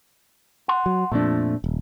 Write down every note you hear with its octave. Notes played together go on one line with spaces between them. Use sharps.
F#5 C6
F#3
F2 A#2 F3 A3 D4
D#1